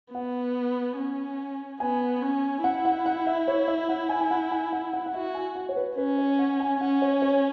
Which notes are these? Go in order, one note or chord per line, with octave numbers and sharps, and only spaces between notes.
B3 F#5
C#4
B3 G#5
C#4
E4 F#5
F#5
F#5
E5
C#5
E5
F#5
G#5
G#5
F#5
G#5
F#5
F#5
F#5
F#4 E5
G#5
F#5
C#5
B4
C#4 B4
C#5
F#5
G#5
C#4 F#5
C#5
C#5